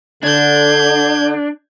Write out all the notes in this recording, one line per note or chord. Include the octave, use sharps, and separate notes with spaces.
D3 D4 G6 G#6